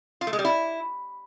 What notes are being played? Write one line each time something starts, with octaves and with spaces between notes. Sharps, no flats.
F4
A3
G#3
G3
E4